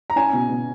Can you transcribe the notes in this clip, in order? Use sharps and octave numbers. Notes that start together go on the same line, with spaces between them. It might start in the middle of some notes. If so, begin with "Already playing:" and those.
A#5
C#4 G#5
B2
B2